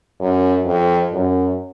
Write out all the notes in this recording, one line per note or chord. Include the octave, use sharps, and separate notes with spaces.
F#2
F2
F#2